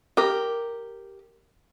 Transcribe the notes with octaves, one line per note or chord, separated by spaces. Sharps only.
G4 A#4